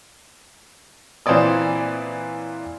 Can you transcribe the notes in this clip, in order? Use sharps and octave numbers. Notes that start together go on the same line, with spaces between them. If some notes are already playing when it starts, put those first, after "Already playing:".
A#2 E3 C4 C#5 D5 D#6